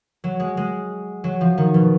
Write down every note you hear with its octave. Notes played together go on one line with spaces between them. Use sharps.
F#3
G#3
G#3
F#3
F3
D#3
B2